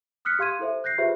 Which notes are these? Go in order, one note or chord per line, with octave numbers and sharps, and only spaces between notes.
D#6 F6 F#6 B6 C#7
G4 F5 C6 G#6 D#7
E4 A4 C5 E5
F#6 G6 A#6 C7
F4 G4 G#4 B4 C5 E5